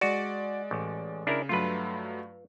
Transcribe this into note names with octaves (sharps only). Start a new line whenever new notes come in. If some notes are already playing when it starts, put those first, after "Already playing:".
G#3 F#4 D5
A1
C#3 D4 E4 A#4
G2 F#3 A3 F4 B4